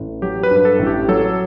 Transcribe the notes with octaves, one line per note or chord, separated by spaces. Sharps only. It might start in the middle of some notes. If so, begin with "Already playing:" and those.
Already playing: A1
F#3 G4
B4
G2
B4
A4
A1
G4
F#3 A4